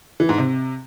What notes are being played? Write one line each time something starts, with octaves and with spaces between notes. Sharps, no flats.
E3
G#2
C3